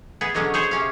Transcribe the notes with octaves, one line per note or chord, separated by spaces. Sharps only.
B3 G#4
B2 D3 F#3 G#3 C#4
G#4 C5 C#5
C3 C#4 F5